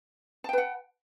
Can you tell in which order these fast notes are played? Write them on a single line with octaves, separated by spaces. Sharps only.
A5 G5 B4 F#5